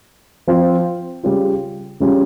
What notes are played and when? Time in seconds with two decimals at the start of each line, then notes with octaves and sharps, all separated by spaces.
0.47 F3 C4 F4
1.23 C#3 G3 C#4 F4
2.00 C#3 G3 C#4 F4